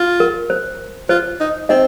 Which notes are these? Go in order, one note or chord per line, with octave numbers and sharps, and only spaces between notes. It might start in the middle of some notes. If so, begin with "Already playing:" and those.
Already playing: F4
A#4
C5
F4 C5
D#4
C4 D#4 D#5